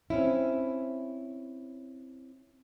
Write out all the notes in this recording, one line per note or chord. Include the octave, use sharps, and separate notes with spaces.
C4 C#4 E4